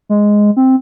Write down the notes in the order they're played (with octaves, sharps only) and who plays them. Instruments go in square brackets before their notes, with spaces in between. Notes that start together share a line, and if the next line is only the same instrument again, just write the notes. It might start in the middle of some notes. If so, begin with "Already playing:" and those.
[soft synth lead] G#3
C4